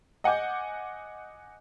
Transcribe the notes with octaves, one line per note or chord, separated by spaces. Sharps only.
D#5 F#5 G#5 D6 G6